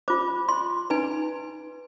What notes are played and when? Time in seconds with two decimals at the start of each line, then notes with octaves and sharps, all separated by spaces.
0.08 F4 C5 D6
0.49 C6
0.90 D#4 B4 G#5